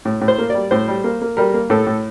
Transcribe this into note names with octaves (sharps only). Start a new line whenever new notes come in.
A2
A2
C5
A#3
G3 D5
A2 C5
G3
A#3
A#3
G3 A#4
A#3
A2 A4
A2